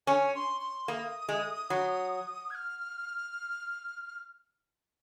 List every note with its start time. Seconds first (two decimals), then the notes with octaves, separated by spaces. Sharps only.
0.07 C#4 G#5
0.35 C6
0.61 C6
0.88 A#3 D#6
1.29 G#3
1.70 F#3
2.50 G#6
2.55 F6